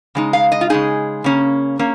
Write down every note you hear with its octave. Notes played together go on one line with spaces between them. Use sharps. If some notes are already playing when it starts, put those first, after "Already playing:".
C#3 G#3 D#4
F5
D#5
F4
C#3 G#3 D#4 G#4
C#3 A#3 C#4
A#3 C#4